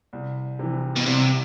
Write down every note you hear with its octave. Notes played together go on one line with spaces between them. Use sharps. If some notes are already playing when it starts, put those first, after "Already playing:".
C2
C3 E3
B2
C2 C3